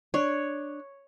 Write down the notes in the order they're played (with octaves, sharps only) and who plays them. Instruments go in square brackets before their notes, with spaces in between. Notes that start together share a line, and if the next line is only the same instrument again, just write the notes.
[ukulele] D4 [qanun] C#5